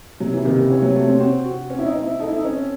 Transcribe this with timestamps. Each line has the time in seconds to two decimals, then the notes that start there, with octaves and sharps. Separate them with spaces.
0.20 C3 F#3
0.32 E3
0.45 C3 D#3
0.58 C#3
0.70 E3 C#5
0.82 F#3
0.95 A3 C#5
1.08 C4
1.20 C4 F#4
1.45 F#4
1.70 C4 C#4
1.78 E4
1.86 D#4
1.95 C4
2.03 E4
2.19 D#4 A4
2.28 E4
2.37 D#4
2.44 C4 C#4